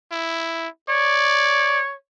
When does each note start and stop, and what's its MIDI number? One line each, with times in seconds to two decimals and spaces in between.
0.12 0.68 64
0.89 1.93 73
0.89 1.80 74